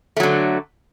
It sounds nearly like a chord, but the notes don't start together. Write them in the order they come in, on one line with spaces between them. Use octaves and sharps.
A3 F#3 D3